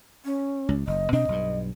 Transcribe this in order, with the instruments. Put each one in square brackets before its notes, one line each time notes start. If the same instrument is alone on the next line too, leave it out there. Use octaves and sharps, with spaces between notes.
[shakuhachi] C#4
[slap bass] C#2
[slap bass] F#1 [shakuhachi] D#5
[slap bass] B2 C4 D4 [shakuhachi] D#5
[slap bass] B1 G2